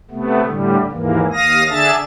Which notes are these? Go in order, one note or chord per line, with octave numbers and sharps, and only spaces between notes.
C3 A3 B3
A2 D3 G3
D#2 G#2 E3 A#3
D#2 F5 D#6 A#6
D3 D4 G#4 E5 A5 A6